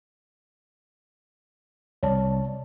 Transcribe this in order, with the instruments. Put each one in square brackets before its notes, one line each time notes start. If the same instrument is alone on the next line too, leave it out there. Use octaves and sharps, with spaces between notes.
[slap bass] C2 [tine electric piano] C#5 D5 A5